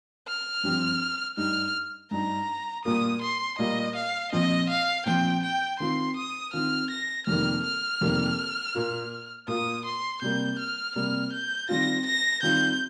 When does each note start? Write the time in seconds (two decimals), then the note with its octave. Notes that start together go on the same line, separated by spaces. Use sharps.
0.28 F6
0.63 G2 F3 C4 G4
1.37 G2 G3 D#4 F6
2.11 G2 G3 D#4 A#5
2.85 A#2 G3 A#3 F4 D#6
3.21 C6
3.58 A#2 G3 A#3 F4 D#5
3.95 F5
4.32 A#2 F3 C4 D#5
4.69 F5
5.06 A#2 F3 C4 G5
5.43 G5
5.79 D#3 C4 F4 C6
6.16 D#6
6.53 D#3 C4 F4 F6
6.90 A#6
7.27 F2 C3 D#3 G3 A#3 F6
7.64 F6
8.01 F2 C3 D#3 G3 A#3
8.75 A#2 A#3 F4
9.48 A#2 A#3 F4 D#6
9.85 C6
10.22 C3 G3 A#3 G6
10.59 F6
10.96 C3 G3 A#3 F6
11.33 G6
11.69 D#3 G3 C4 F4 A#6
12.06 A#6
12.43 D#3 G3 C4 F4 G6